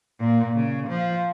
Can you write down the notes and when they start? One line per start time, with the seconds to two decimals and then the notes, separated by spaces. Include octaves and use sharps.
0.20 A#2
0.55 C#3
0.88 F3